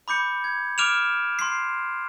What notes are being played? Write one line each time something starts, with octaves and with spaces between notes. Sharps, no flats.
B5 D6 G6 C#7
G#6
D6 F6 D7 E7 F7
C6 C7